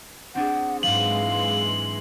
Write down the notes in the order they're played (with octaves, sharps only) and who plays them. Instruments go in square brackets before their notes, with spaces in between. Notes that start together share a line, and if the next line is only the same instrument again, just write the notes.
[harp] C4 D4 G#4 [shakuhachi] F#5
[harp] G#2 F#3 [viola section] E3 G#3 C6 [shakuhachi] F5 [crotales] F#7